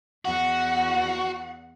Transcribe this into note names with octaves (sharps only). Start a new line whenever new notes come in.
E2 F#4 F#5